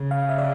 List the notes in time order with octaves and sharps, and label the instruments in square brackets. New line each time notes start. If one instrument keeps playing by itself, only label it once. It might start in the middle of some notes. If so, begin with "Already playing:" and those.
Already playing: [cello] C#3
[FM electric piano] F5
E5
D5